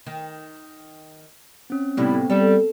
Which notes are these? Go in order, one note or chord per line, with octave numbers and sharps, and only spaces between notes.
D#3
C4 C#4
A2 C3 G3 B3 C4 E4
G3 A4